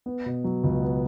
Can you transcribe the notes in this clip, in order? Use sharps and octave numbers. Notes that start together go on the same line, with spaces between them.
B3
B2
F#3
C#2
B3